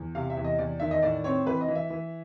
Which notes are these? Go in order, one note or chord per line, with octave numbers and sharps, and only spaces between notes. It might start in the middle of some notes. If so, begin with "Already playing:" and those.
Already playing: E2
C3 F5
E5
E2
D#5
E2 D5
D#3 E5
D#5
A2 D5
C4 C#5
E3 B4
D#5
E3
E5
E3